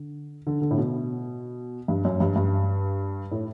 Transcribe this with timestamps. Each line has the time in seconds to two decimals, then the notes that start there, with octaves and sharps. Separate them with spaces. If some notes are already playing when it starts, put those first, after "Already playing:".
Already playing: D3
0.47 D3
0.62 D3
0.71 A2
0.78 B2
1.88 G2
2.05 F#2
2.20 G2
2.36 G2
3.31 A2